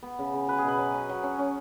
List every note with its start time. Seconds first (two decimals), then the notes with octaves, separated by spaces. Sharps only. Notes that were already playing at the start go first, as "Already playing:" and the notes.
0.03 B3
0.19 C#3
0.33 C#3
0.48 F#3 B4
0.58 G#4
0.64 B2 B4
0.78 F#3
0.94 C#4
1.09 F#3
1.23 C#4
1.38 C#4